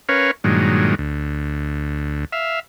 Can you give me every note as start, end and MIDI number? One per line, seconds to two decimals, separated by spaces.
0.09 0.31 61
0.09 0.31 70
0.09 0.31 71
0.09 0.31 73
0.09 0.31 77
0.44 0.95 43
0.44 0.95 46
0.44 0.95 51
0.44 0.95 54
0.44 0.95 56
0.98 2.25 38
2.32 2.60 76
2.32 2.60 77